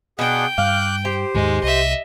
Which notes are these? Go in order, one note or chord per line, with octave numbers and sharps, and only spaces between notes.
B2 D4 G#4 F#5 G5
G2 F5 D6 F#6 G6
G4 C5
D#2 G#2 D#3 G#3
C2 D#5 E5